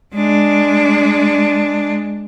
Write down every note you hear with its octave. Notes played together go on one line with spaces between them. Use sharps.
G#3 D4